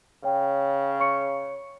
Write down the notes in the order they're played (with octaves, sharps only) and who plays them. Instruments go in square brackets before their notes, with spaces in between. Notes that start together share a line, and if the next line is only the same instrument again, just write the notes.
[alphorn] C#3 [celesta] C#5 G5
[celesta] C#5 C#6 C#7